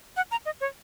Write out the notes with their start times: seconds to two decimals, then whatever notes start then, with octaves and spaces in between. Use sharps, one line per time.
0.17 F#5
0.31 A#5
0.46 D#5
0.61 C#5